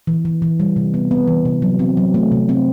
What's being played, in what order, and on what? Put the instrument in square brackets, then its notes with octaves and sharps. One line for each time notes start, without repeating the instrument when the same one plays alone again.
[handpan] E3
E3
E3
G3
C3
B3
B3
E3
C3
F#3
C4
F#3
A3
C3
C4